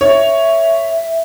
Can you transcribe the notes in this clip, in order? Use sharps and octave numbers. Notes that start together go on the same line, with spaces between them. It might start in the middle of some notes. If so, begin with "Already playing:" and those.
C#5 E5